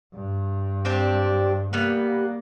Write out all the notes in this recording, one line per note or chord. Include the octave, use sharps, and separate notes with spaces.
G2
C4 D4 G4
G3 A#3 B3